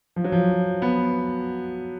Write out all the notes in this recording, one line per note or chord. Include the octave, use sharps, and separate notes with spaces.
F3
F#3
F3
B3